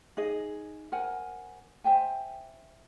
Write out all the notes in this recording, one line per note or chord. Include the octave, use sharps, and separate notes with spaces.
D#4 G#4 D#5
A#4 C5 F#5 G#5
C5 E5 G5 G#5